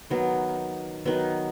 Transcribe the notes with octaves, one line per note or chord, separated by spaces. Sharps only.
D#3 F#3 B3
D#3 F#3 B3